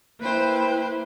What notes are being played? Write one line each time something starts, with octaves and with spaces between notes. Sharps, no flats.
A#3 E4 B4 C5 G5